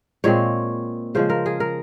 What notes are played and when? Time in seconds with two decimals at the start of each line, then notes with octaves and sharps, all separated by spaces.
0.24 A#2 G#3 C4 C#5
1.15 C#3 F3 G#3 C5
1.30 A#4
1.46 G#4
1.60 A#4